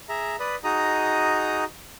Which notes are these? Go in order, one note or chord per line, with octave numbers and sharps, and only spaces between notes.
G#4 E5 A#5
B4 D5 B5 D#6
D#4 F#4 G#4 D#5 A#5 D#6